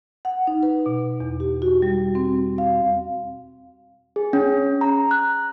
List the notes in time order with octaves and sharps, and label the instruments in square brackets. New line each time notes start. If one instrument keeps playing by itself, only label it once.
[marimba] F#5
D#4
B4
B2
E2
G4
F#4
G3
C4
F5
[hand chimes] G#4
C#4
A#5
F#6